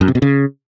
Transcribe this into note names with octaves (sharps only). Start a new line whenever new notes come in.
F#2
C3
B2
C#3